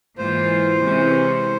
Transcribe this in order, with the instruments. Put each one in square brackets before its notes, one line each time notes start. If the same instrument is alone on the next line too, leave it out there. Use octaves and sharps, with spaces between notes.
[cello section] G#2 E3 A#3 F4 [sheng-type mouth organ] C5
[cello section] C3 E3 G#3 C#4